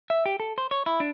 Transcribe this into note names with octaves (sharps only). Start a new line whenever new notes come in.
E5
G4
A4
C5
C#5
E4
D4